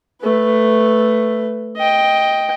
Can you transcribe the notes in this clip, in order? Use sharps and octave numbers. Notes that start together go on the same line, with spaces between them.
A3 B4
D#5 G5